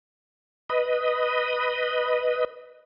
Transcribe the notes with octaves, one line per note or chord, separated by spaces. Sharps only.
B4 D#5